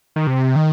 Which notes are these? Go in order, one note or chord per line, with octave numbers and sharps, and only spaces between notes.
D#3
C3
D#3